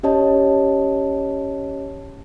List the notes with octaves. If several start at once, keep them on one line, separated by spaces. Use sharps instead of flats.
C#4 G4 C#5 D#5 A5